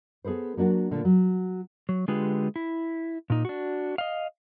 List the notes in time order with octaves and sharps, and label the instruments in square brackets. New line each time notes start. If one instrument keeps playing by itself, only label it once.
[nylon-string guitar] B3 G#4 A4 B4 C5
F#3 A#3 D4 F#4
A#2 D3 A3
F#3
[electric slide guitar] F#3
D3 G#3 F4 G4 G#4 B4
E4
A#2 D#4
D4 F#4
D#5 F5